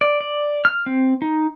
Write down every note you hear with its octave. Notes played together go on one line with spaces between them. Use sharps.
D5
D5
F6
C4
D#4